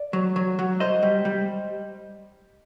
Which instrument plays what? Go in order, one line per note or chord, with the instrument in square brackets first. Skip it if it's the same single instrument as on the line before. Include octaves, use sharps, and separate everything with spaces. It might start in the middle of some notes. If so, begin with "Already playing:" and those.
Already playing: [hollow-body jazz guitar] D5
F#3
F#3
F#3
C2 C5 D#5
G3
G3